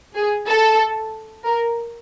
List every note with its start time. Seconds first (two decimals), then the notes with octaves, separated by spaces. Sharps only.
0.15 G#4
0.48 A4
1.45 A#4